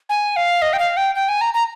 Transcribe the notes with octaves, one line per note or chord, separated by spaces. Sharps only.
G#5
F5
D#5
G5
F5
G5
G5
G#5
A#5
A#5